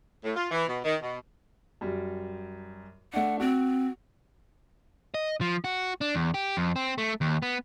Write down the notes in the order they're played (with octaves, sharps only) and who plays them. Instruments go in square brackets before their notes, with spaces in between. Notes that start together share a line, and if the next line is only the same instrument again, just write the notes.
[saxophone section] A2
F4
E3
B2
D#3
B2
[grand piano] F#2 G3
[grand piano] A3 D4 [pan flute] F#5
[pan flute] C4 [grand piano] F#4
[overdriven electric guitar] D#5
F3
F#4
D4
E2
G4
F2
C4
A3
D#2
B3